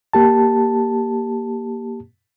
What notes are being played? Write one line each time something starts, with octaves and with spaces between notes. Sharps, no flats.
A#3 G4 A5